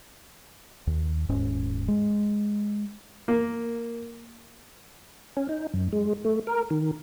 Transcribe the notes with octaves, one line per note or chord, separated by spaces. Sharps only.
D#2
D#1 G#2 C#4
G#3
A#3
C#4
D#4
F#2
G#3
A3
A#4
D#3